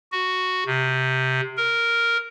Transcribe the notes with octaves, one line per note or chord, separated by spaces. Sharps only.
F#4
C3
A#4